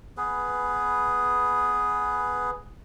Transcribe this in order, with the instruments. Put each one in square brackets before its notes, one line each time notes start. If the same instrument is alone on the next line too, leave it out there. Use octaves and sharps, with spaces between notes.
[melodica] B3 G#4 B4